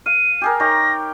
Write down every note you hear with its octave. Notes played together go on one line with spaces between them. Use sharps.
F5 D#7
G4 G#4 A#4
D#4 G4 C#5 A#6